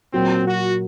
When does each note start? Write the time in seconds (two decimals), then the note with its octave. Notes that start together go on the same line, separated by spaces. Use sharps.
0.13 A#2 F#3 A#3 C4
0.46 F#4